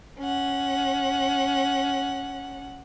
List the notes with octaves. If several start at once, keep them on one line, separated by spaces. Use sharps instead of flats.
C#4 F#5